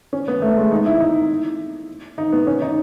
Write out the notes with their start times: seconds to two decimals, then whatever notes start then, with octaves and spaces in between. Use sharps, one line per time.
0.13 C#4
0.28 B3
0.42 A3
0.57 G#3
0.72 D#4
0.86 E4
1.00 D#4
2.18 D#4
2.32 B3
2.47 C#4
2.62 D#4